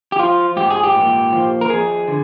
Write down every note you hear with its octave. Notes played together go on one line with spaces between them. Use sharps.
G4
F3 F4
G#2 G4
G#4
G4
A#2
F3
A#4
F2 G#4
D3